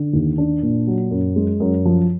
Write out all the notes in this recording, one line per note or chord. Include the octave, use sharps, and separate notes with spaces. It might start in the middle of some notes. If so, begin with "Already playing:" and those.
Already playing: D3
D#2
D4
A#2
F#3
F#2
G#3
F#2
F3